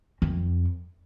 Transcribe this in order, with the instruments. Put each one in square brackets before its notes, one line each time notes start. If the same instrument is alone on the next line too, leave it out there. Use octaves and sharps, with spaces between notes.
[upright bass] F2